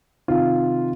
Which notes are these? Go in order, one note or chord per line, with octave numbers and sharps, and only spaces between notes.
C3 D#3 F4